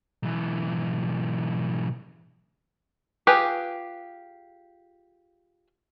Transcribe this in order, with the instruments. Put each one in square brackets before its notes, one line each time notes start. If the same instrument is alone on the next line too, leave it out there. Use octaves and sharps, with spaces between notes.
[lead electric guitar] B1 E3
[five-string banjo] F4 G4 G#4 B4